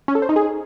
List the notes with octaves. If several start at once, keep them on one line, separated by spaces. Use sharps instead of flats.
C#4
A4
C5
D#4
G#4